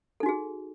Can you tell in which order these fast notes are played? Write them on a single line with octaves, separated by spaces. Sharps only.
A4 D#4 F#4 G#4